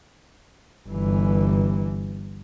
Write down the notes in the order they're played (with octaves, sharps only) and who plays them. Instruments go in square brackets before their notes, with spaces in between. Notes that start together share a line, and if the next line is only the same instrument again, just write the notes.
[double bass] G1 E3